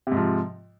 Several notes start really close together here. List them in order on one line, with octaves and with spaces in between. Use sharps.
C3 G#2 F3